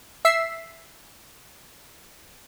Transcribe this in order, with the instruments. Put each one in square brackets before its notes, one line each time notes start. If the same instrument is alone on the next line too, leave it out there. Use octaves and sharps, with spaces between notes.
[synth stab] E5 E6 B6 C7